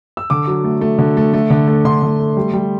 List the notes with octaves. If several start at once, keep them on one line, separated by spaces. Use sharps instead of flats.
E6
D3 D6
F#3
A3
A3
D3
A3
A3
D3
A3
D3 C6
D3
A3
G3
G3